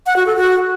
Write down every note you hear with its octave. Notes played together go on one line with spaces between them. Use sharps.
F#5
F#4
A4
F#4